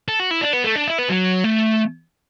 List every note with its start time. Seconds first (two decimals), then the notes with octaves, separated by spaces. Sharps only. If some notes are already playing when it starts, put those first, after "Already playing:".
0.08 A4
0.20 F#4
0.31 E4
0.41 D4
0.53 B3
0.64 A3
0.76 D4
0.87 E4
0.98 B3
1.09 F#3
1.44 A3